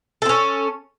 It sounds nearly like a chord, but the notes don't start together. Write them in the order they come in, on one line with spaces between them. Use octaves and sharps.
A4 C4 C#4